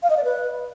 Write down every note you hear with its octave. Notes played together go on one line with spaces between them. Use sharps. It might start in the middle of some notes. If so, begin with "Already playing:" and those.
F5
D#5
D5
B4